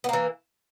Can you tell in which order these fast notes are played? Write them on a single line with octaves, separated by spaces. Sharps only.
B3 A#3 E3